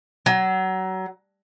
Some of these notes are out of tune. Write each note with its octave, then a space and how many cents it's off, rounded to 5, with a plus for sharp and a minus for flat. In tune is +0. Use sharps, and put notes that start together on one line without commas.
F#3 +25